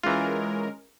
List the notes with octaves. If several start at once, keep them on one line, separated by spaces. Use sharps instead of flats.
E3 G#3 C#4 F4 A#4